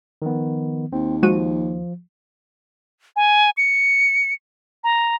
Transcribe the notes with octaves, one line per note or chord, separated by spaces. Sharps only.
D#3 F3 B3
D#2 C4
F3 G#3 F#4 D#7
G#5
C#7
A#5